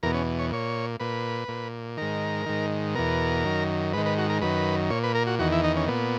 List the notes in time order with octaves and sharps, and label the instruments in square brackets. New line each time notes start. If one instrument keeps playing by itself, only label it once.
[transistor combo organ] E2 B2 A#4
C#4
C#5
A#2 C#5
A#2 B4
A#2
G#2 D#3 A#4
G#2 D#3
E2 B2 A#4
F#2 D#3
G#2 D#3 B4
B4
F#4
A#4
F#2 D#3 B4
A#2 C#5
B4
A#4
F#4
E2 D#3 F#4
E4
D#4
C#4
A#2 B3